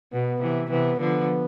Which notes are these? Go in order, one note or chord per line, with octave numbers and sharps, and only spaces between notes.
B2 B3
C3 E3
C3 E3 B3
D3 F3 B3